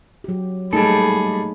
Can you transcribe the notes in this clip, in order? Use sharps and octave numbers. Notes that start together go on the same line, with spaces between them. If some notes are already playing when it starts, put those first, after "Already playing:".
F#3 G4
G3 A3 A#3 D#4 G#4 A4 B5